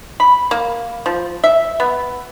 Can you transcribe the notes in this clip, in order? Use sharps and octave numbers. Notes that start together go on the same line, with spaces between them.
B5
A#3
F3
E5
B3